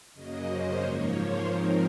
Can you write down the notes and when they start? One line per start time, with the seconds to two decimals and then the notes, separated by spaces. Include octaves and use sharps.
0.14 F#2 C#3 F#3 A#3 D#5
0.47 C5
0.80 G#2 F3 A#3 C#5
1.13 C5
1.47 G#2 F3 C4 D#4 A#4